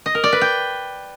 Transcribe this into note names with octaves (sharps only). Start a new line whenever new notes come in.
D#5
A#4
D5
B4
G5